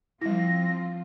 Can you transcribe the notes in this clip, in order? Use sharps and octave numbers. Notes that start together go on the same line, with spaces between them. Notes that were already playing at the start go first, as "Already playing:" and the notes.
F3 G3 C4 E4 F4 A#6